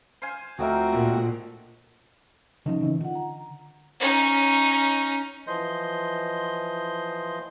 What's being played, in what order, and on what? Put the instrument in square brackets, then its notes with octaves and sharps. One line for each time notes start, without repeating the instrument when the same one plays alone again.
[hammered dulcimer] C5 F5 G#5
[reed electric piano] D2 A3 E5 [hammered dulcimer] F3 D#4 A#4 [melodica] C4 F#4
[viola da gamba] A#2 [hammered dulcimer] D3
[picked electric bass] D3 E3 F3 [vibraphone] C#4 D#4 D#5
[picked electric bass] C#3 E3 C4
[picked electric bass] D3 [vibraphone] F4 F#5
[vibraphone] A#5
[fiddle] C#4 D#4
[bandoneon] E3 F3 D#5 C6 G6